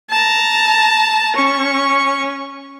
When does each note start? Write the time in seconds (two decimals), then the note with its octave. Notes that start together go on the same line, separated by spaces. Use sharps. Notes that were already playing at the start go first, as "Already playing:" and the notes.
0.11 A5 A#5
1.36 C#4 C#6